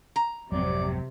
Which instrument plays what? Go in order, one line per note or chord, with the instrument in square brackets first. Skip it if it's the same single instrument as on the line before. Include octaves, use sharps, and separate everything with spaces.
[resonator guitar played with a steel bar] A#5
[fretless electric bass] G#1 F2 F#3 [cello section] C3 [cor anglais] D5